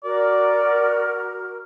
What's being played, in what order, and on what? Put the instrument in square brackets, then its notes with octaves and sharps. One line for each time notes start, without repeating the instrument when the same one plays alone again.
[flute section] F#4 A#4 [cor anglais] D5